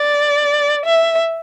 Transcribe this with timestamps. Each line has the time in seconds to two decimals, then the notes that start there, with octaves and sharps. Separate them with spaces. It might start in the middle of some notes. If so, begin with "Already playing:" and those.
Already playing: D5
0.86 E5